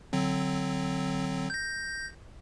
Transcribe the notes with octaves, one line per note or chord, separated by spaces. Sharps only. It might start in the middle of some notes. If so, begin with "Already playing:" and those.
D3 F#3 C4
G6 A#6